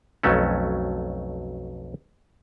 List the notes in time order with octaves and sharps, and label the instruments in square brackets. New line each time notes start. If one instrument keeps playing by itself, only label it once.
[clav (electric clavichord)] B1 F2 F#3 A3 C#4